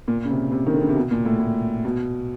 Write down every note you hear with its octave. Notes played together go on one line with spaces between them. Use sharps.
A#2
C#3
C3
C3
D#3
D3
C#3
C3
B2
A#2
A2
A2
B2